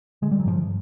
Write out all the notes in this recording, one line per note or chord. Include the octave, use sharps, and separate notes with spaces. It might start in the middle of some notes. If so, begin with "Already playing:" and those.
D3 G#3
G3
F#3
G2 F3 G3